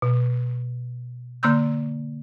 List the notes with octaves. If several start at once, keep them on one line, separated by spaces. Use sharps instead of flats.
B2
D3 A#3 C6 E6 G6